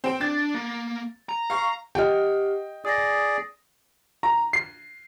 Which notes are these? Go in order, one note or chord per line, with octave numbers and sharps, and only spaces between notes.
C4 G5
D4 A6
A#3
A#5
F5 C#6
G4 D#5 F#5 G5 F6
G#4 D5 D#6 A#6
A#5
C7